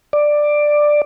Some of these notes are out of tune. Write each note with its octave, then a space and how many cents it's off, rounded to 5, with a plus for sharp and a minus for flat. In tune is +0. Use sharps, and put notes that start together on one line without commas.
D5 +10